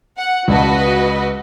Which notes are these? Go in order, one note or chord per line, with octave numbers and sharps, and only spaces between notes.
F#5
C#2 F#4 B4 D5 D#5 A5